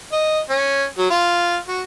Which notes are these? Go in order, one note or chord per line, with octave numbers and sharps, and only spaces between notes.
D#5
C#4
F#3
F4
F#4